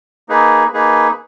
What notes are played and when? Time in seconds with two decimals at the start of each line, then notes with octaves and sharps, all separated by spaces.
0.29 A#3 D#4 G#4 B4
0.73 A#3 D#4 G#4 B4